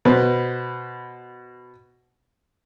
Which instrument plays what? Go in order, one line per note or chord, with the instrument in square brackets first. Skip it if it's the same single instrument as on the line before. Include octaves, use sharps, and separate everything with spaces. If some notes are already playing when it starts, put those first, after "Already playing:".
[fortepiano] B2 B4 C5